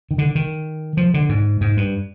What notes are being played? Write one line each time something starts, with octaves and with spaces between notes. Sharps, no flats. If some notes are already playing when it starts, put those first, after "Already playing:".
D#3
D3
D#3
F3
D3
G#2
G#2
G2